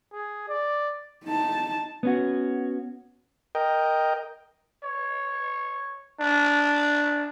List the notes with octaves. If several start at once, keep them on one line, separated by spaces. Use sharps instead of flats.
G#4
D5
D#4 A5
B3 C#4 F#4
A#4 D#5 G5
C#5
D4